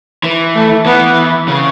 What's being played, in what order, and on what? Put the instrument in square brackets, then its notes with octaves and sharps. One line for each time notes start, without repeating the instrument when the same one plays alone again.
[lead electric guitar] E3
[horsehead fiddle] A3
[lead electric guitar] E3 [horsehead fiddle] B3
[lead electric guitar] C#3